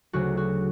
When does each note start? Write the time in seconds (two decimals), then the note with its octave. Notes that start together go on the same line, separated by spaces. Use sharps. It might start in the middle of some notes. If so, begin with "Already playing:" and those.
0.13 D2 C#3 F#3 F#4
0.37 F#4